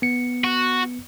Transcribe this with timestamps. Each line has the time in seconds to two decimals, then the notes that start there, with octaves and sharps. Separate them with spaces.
0.02 B3 C#7
0.44 F#4